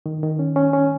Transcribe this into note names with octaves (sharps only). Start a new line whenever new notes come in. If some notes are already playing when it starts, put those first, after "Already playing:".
D#3
D#3
C#4
C#4
C#4